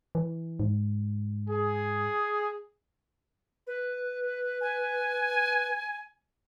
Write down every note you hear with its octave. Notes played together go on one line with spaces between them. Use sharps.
E3
G#2
G#4
B4
G#5